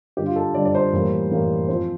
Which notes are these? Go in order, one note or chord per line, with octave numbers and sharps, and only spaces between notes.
G2 D3 G3 G4
F4
A4
G2 D3 G3 D5
D5
C5
A2 E3 G3 A#3
A2 E3 G3 A#3
F3 C4 C5